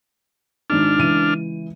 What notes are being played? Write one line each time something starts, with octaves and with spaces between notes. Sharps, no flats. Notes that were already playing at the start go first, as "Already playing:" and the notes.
G#1 D4 D#4 F6
C#2 E3 D#7